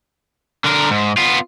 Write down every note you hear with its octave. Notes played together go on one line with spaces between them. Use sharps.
D3 A#4
G#2
B3 F4